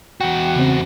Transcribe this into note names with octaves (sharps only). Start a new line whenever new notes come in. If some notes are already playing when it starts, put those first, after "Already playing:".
E2 F#4 G5
C#3 C4